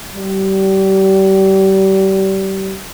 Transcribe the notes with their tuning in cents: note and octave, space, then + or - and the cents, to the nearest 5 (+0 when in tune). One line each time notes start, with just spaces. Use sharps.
G3 -30